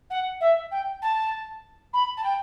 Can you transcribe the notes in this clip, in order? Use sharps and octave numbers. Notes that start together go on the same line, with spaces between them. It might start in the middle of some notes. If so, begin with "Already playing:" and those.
F#5
E5
G5
A5
B5
A5
G5